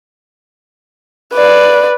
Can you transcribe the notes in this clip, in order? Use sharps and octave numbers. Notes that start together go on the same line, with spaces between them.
B4 D5